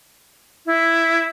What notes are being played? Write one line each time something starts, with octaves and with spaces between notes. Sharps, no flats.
E4